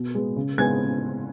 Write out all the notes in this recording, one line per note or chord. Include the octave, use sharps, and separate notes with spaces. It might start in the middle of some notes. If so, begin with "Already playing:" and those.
Already playing: B2
G#3 B3
C#3
G#3 B3 G#5 G#6